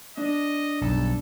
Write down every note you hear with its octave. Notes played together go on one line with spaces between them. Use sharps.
D4 D#5
B1 G2 A4